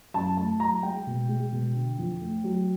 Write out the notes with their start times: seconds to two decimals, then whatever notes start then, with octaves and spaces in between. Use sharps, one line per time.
0.14 F#2 A5
0.37 A3 A5
0.60 F#3 A#5
0.83 G#3 G5
1.07 B2
1.29 G#3
1.52 B2
1.75 D3
1.98 F2
2.21 A3
2.44 F#3